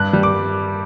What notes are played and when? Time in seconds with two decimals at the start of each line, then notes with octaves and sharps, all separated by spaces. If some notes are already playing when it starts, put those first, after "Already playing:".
Already playing: G2 F#6
0.13 G3
0.23 D6